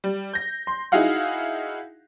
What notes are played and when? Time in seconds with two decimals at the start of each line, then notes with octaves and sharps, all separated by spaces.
0.04 G3
0.33 G6 A#6
0.67 C6
0.92 D#4 E4 F#4 G#4 F5 F#5